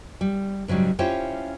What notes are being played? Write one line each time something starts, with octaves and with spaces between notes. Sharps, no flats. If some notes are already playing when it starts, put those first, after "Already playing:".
G3
G#2 C#3 F#3 G3
C#4 E4 F4 G4 C5 C#5